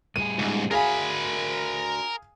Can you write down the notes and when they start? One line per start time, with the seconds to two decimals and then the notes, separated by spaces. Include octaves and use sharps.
0.16 A2 G3 G#4 D#7
0.39 C#2 G#2
0.71 D4 F#4 G#4 A#4 F5 G#5 B5